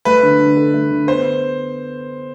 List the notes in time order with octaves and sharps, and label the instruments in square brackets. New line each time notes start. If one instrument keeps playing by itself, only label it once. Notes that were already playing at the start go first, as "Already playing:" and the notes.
[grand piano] A3 [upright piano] B4
[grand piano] D3
D4
A4
A3
D3
[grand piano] B3 [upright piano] C5